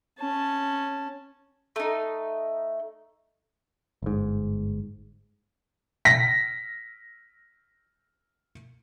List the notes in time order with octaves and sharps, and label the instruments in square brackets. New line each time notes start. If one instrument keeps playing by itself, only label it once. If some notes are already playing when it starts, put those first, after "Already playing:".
[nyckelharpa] C#4 A5
[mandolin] A3 D#4
[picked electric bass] G1 G#2
[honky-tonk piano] A#6 B6